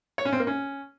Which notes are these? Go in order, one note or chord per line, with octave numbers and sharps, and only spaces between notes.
C#5
C#4
C4
A#3
C#4